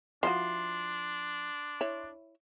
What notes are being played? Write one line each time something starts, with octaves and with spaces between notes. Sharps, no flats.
F3 D4 E4 F#4 C6
E4 C#5